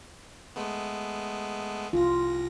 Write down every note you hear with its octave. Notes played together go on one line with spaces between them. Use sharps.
G#3 A3 B3
C2 F4 A#6